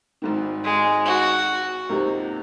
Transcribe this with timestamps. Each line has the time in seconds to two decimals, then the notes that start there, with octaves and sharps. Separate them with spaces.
0.22 G#1 G#2 D#3
0.64 G#3
1.06 F#4
1.89 C#2 C3 F3 A#3 D#4